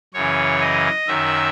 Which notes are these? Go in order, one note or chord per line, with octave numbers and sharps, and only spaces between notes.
F#2 C#3 E3 C#5
D#5
F#2 D#3 F#3 E5